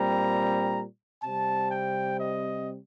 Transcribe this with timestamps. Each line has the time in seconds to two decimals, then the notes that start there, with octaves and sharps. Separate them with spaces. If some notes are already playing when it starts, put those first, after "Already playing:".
Already playing: A#2 G3 C4 A#5
1.22 C3 G3 C4 A5
1.70 G5
2.18 D#5